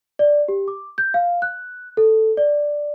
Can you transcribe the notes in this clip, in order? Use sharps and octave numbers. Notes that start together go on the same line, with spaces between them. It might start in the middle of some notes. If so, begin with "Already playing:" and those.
D5
G4
D6
G6
F5
F#6
A4
D5